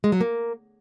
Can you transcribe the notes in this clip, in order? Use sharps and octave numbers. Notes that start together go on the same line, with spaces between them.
G#3
F#3
A#3